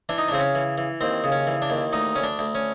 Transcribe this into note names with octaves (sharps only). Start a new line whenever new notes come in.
E3 D4
D#4
D4
C#3 C4
C#4
E3
E3
D#2 C4
C#3
C#4
E3
D4
D#2
D2 D#4
D2 C#4
D4
D2
C#4